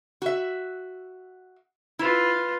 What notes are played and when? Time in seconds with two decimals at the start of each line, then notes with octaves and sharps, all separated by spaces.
0.22 F#4 E5
1.99 E4 F4 B4